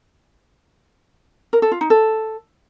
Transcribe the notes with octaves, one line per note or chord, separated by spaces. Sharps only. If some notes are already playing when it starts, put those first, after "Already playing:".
A#4
A4
F4
D#4
A4